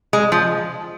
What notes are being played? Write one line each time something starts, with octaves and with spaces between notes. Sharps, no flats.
G#3
F3